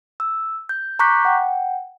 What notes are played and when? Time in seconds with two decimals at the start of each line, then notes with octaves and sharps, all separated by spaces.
0.20 E6
0.69 G6
0.99 A#5 C#6 D6 F#6 G6 B6
1.25 F#5 G5